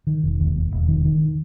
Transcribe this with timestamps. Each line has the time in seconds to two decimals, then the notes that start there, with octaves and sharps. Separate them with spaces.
0.07 D#3
0.23 E1
0.40 D#2
0.55 E1
0.72 E1
0.88 D#3
1.05 D#3